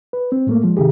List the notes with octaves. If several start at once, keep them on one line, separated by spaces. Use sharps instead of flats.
B4
C4
A2 A3 A#3
F3 G#3
C3 D#3 G4 G#4